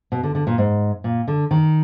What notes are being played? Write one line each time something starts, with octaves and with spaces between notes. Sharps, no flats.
B2
D3
D3
A#2
G#2
A#2
D3
D#3